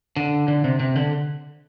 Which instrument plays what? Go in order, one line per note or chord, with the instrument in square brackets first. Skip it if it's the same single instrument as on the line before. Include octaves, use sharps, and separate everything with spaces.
[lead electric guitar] D3
D3
C3
C3
D3